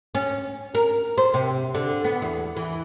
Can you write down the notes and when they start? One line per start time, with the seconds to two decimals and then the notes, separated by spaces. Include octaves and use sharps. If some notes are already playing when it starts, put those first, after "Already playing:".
0.15 C#4
0.75 A#4
1.18 C5
1.34 C3
1.75 D3
2.04 B3
2.22 E2
2.57 E3